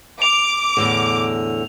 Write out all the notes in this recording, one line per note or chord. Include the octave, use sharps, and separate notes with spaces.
D6 F7
E2 A2 D3